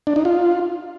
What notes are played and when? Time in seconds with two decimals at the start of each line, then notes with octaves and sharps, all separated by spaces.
0.07 D4
0.16 D#4
0.25 F4